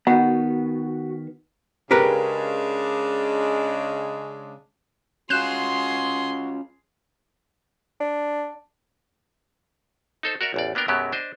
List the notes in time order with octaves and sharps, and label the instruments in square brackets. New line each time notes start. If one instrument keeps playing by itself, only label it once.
[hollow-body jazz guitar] D#3 B3 [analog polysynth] F#4 [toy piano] F#5
[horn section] C#3 G#3 D4 [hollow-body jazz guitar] G4 A#4 B4
[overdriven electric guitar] C#4 F4 [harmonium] F#4 [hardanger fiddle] G#4 C6 [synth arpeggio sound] F#6 G6 E7
[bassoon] D4
[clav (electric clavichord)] D#4 A4 C5
F#4 A#4 D5 E5
A1 E2 D5
A#3 B3 D4 A#4 G5
F#2 B2 F#3 G#3 B3 G4
D4 C5 D#5